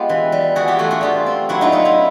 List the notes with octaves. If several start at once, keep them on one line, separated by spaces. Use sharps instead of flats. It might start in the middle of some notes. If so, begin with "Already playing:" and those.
Already playing: G#3 B3 F4 G4
E3
G3
E3 F#4 G#4
F4 G4
A3 F#4 G#4
F#4 G#4
G3 F4 G4
C4
F#3 E4 F#4
D#4 F4
B3 D#4
E4